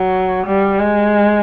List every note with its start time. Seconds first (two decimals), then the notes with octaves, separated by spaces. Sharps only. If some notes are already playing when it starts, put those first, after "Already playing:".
Already playing: F#3
0.46 G3
0.79 G#3